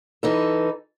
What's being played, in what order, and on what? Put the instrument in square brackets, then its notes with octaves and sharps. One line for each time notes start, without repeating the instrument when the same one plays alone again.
[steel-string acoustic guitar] E3 D#4 A4